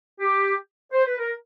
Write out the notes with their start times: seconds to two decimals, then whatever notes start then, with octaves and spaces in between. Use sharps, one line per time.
0.21 G4
0.93 C5
1.06 B4
1.19 A#4